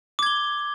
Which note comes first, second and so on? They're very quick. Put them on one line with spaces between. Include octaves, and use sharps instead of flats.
D6 G#6 G7